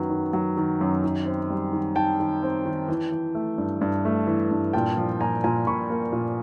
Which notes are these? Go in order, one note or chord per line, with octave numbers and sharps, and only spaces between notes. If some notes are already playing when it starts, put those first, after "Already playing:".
Already playing: F#2 D#3 F#3 B3
D#3
F#3
D#3
F#2
D#3
C4
G3
D#3
D#3 G5 A5
D#3
C4
D#3
E3
E3
A3
G2
G2
A3
E3
G2
A#2 G5 A5
F3
A#2 G#5 A#5
A#2 G#5 A#5
A#2 B5 C#6
A#3
A#2